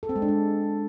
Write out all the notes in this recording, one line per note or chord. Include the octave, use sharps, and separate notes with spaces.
A4
C4
G#3
D4
G#3